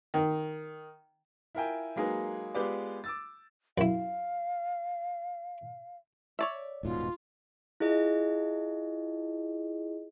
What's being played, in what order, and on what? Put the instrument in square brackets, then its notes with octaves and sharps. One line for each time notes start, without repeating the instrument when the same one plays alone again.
[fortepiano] D#3
[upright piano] E4 F4 A#4 E5 G5 G#5
F#3 G#3 A#3 D#4 G#4 B4
G#3 B3 F4 G4 B4 D5
D6 E6 A6
[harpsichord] F#2 E4 [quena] F5
[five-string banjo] C#5 D5 E5
[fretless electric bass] D#1 G#2 B2 [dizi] F4
[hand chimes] E4 F4 G#4 D#5